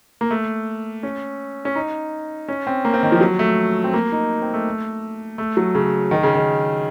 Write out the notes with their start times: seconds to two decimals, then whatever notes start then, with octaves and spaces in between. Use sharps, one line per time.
0.21 A#3
0.31 A3
1.03 C#4
1.65 C#4
1.75 D#4
2.48 C#4
2.67 C4
2.85 A#3
2.94 C4
3.03 D#3
3.12 F3
3.21 F#3
3.39 A3
3.84 C4
3.94 A#3
4.12 D#4
4.42 C4
4.54 A3
5.38 A3
5.57 F#3
5.75 C#3
6.11 D#3
6.23 C#3
6.35 D#3